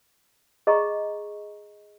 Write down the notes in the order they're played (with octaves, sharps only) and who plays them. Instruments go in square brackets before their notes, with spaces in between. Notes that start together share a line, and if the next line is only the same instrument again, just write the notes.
[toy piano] G#4 D#5 A#5 C#6